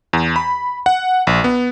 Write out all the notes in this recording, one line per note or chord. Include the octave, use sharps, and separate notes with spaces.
E2
B5
F#5
A#1
B3